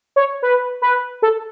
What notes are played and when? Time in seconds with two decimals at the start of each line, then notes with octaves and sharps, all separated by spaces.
0.16 C#5
0.42 B4
0.82 B4
1.22 A4